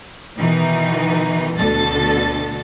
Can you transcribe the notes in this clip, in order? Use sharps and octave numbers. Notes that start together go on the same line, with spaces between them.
B2 D#3 E3 D#4
D2 B2 D3 A4 A6